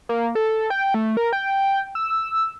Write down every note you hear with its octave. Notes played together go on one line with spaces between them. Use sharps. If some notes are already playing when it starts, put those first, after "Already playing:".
A#3
A4
G5
A3
A#4
G5
E6